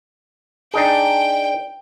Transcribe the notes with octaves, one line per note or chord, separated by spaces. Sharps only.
D4 D#4 G#4 G5